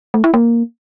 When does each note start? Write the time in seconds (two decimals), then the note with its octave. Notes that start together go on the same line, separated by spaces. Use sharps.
0.14 A3
0.24 E4
0.34 A#3